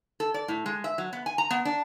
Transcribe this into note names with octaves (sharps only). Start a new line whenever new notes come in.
A4
D5
A2
G#3
E5
F#3
B3
G#5
A#5
B3
D4